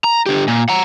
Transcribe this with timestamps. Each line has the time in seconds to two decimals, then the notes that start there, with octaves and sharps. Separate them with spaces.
0.04 A#5
0.26 D3 G4
0.48 A#2
0.69 F#5 A#5